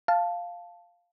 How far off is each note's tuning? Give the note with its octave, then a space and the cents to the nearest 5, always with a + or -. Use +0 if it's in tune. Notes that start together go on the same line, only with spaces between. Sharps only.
F5 +0 A5 +0